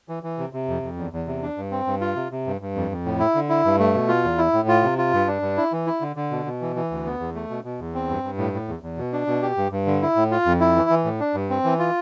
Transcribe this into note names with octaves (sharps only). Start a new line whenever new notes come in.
E3
E3
C3
C3
F2
F2
E2
E2
C3
D4
G2
C4
G2
F4
C3
C3
G2
G2
F2
F2
A2
E4
D3
E4
G2
A3
B2
F4
E2
E4
A2
F4
C3
F4
G2
D4
G2
E4
E3
E4
D3
D3
B2
B2
E3
E3
D2
B3
E2
A3
B2
B2
E2
C4
G2
G2
A2
A2
E2
E2
B2
D4
B2
G4
G2
G2
D3
E4
A2
F4
F2
E4
E3
E3
A2
D4
G2
C4
E3
F4